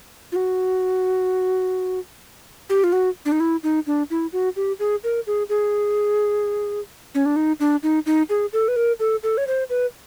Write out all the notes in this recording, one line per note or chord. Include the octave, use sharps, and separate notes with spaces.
F4
F#4
G4
F4
F#4
D4
D#4
E4
D#4
D4
E4
F#4
G4
G#4
A#4
G#4
G#4
C#4
D4
D#4
D4
D#4
D#4
G#4
A4
B4
A#4
A4
A4
C#5
C5
B4